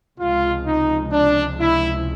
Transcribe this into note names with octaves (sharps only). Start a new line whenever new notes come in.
C#2 C3 F3 G#3 F4
D#4
D4
E4